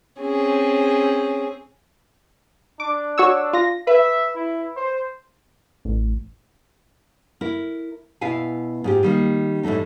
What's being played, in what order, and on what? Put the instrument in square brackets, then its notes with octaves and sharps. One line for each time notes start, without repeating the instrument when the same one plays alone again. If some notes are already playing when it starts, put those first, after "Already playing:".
[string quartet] C4 C#4 G#4
[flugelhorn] D4 [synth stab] D6
[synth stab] F#4 C#5 E6
F4 A#6
[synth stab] B4 [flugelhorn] E5
[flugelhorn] E4
C5
[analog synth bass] A1
[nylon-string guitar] E4 A#4
B2 E4 E5 F5 G#5
G#2 F4 G4
D#3 G3 A#3
A2 E3 G3 A3 D#4